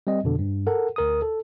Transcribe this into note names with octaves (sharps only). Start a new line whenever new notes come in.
G3 C4 D#5
F2 B2 D3
G2
A4 A#4 F#5
D2 A#4 D#6
A4